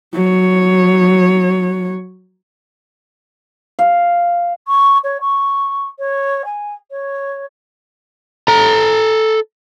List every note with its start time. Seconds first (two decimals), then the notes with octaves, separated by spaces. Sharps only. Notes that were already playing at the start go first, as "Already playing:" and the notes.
0.14 F#3 C#5
3.79 F5
4.67 C#6
5.04 C#5
5.20 C#6
5.98 C#5
6.45 G#5
6.91 C#5
8.48 A4 A#5